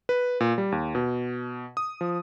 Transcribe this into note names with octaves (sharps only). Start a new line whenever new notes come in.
B4
A#2
G3
D#2
B2
D#6
F3